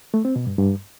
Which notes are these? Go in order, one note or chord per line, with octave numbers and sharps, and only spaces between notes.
A3
C4
B2
G2
G2